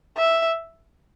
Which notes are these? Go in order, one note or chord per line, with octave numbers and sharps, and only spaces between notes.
E5